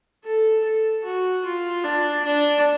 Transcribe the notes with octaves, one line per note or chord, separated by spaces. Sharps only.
A4
A4
F#4
F4
D4
D4